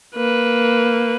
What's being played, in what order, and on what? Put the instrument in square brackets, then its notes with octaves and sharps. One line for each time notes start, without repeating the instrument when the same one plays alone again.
[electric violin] A#3 B4